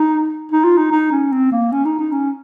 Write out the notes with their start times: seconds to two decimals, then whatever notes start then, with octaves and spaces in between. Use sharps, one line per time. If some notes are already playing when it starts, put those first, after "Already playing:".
Already playing: D#4
0.52 D#4
0.64 F4
0.78 D#4
0.92 D#4
1.11 C#4
1.32 C4
1.52 A#3
1.72 C#4
1.85 D#4
1.99 D#4
2.12 C#4